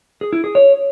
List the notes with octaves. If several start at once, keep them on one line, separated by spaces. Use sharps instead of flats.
G#4
E4
G#4
C#5